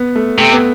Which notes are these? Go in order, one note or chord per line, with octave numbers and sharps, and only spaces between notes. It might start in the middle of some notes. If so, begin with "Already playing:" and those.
Already playing: B3
A3
C3 A3
B3